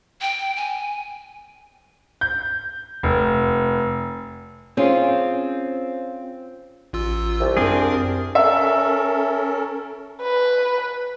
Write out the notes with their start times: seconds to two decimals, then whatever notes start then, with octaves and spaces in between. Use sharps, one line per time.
0.21 G5
0.56 G#5
2.21 G6
3.03 F1
4.77 C4 C#4 F4 G#4
6.93 A1 F4 E6
7.40 C2
7.57 F#2 C4 D4 G#4 A#4
8.35 C#4 A4 A#4 E5
10.22 B4